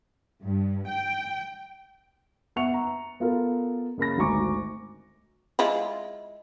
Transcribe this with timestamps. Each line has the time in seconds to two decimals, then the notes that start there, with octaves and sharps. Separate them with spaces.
0.44 G2
0.88 G5
2.56 B3 E5 F#5 C#6 C#7 F7
2.74 A#5
3.20 B3 F4 A4 A#4
3.98 C#3 A#3 B5 A#6
4.18 G#1 D2 G#5 A#5 C#6 D6
5.59 G#3 E4 F4